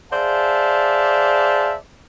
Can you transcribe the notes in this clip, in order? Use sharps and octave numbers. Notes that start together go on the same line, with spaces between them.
G#4 C5 D5 E5 F5 A5